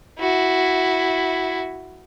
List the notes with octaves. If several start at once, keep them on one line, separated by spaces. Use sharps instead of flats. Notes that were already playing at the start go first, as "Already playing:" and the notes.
E4 F#4